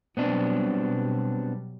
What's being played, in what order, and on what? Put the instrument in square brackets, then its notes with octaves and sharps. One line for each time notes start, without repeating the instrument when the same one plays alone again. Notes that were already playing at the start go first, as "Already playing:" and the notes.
[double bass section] B2 F#3 G3 [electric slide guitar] B3 C4 D4